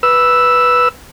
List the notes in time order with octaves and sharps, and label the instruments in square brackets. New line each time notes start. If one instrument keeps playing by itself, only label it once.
[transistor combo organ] B4 E6